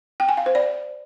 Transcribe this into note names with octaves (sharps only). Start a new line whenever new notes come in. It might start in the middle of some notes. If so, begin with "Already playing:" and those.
G5
G#5
F5
C5
D5